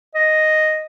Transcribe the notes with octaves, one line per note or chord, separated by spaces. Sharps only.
D#5